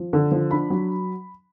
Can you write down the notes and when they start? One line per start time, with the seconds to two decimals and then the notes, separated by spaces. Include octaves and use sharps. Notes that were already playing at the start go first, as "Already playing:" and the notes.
Already playing: F3
0.13 D3
0.31 F3
0.50 D4 B5
0.70 F#3